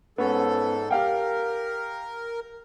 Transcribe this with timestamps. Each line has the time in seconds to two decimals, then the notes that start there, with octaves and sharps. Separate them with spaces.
0.18 G#2 B3 C#4 A4
0.91 G4 A#4 F5 G5